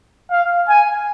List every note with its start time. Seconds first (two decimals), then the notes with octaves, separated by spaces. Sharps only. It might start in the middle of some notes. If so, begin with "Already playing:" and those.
0.31 F5
0.69 G#5